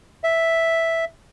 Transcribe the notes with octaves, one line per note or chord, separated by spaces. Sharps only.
E5